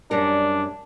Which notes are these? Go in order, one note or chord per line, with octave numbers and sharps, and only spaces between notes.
F#2 G3 D4 A#4